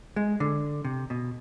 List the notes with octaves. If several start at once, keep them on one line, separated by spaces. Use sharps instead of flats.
G#3
D3
C3
B2